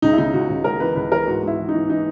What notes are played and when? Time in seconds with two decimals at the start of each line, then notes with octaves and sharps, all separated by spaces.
0.02 C#2 D#4
0.13 E4
0.18 C#3 D#4
0.34 C#2 F#4
0.49 C#2
0.64 C#2 A#4
0.80 E3 B4
0.96 C#2 B4
1.11 E3 A#4
1.27 G#2 F#4
1.43 G#2 E4
1.59 E3
1.69 D#4
1.74 E3
1.89 E3 D#4